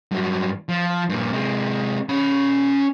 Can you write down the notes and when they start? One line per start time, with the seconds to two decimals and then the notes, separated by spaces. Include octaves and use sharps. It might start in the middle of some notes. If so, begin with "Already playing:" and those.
0.11 G2 F#3
0.69 F3
1.09 G2 A#2
1.33 C3 G#3
2.09 C#4 B5